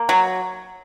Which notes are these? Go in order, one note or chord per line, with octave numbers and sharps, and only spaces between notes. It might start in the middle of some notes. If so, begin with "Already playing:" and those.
Already playing: A#3
F#3